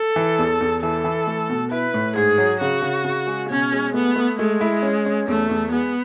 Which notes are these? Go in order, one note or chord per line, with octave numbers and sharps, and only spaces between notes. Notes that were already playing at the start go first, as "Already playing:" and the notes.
Already playing: A4
E3
E2
E2
E3 A4
E3
A3
B2
E4 B4
A2
G#2 G#4
F#3
C#3 F#4
C#3
C#3
G#3
B2 C#4
G#3
A3 B3
A3
G#3 A3
E4
C#4
C#4
E2 A3
E2
G#3 B3